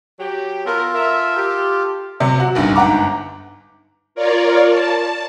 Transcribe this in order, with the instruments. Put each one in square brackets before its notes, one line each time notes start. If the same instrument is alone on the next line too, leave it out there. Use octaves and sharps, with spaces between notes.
[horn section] F#3 G4
[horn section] B3 A#4 [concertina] F4 A4
[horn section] A#4 E5
G4
[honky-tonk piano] C3 F#3
F#4
F#1 B1 G2
G1 G#2 F#5 A#5 D6
[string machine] F4 A#4 C#5 D5
A5